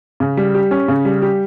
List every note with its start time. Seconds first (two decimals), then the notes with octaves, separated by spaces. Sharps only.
0.20 C#3
0.37 G3
0.55 G4
0.71 C#4
0.88 C#3
1.05 G3
1.22 G4